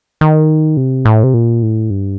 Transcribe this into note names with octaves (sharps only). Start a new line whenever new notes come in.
D#3
C3
A2
C3
A#2
A2
G2